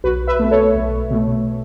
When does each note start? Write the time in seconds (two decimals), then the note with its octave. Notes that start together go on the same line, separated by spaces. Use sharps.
0.04 B1 F#4 B4
0.27 B4 E5
0.39 B2 A3
0.51 A4 C#5
0.75 B1
1.11 B2 A3